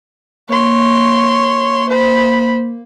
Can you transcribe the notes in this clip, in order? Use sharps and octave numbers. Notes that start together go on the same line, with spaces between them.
A#3 C#5 C6
C5 B5